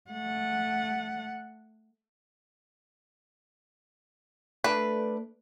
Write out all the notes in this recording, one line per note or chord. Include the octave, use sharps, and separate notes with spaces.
A3 F#5
A3 D4 B4